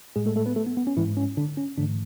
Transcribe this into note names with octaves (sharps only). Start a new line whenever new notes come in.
A2 G#3 G#4
A3 A4
A3 A4
B3 B4
A3 A4
B3
B3
C#4
G#2 E3 G#3 E4
C#4
D3 D4
C#4
G#2 D3 E3 A3 D4